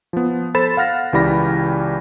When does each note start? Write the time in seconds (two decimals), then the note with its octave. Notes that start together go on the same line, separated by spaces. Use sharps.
0.13 F3 B3
0.54 A4 C5 B5 A6 E7
0.77 F5 F#5 F6 A#6
1.13 C#2 E3 G4 D5 B5 A#6